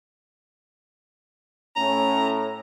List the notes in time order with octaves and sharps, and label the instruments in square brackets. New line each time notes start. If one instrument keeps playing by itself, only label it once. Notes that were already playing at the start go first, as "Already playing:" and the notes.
[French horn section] A2 C#4 [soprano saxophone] A#5